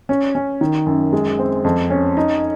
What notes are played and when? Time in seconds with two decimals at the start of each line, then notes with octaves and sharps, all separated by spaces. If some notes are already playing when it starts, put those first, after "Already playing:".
0.09 C#4
0.35 C#4
0.61 D#3
0.87 F#2
1.13 G#3
1.39 C4
1.64 F2
1.90 C#4
2.17 D#4